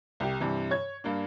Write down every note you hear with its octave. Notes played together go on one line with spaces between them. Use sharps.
C2 G4
G2 C3 E3
C#5 G#6
G2 A#3 D4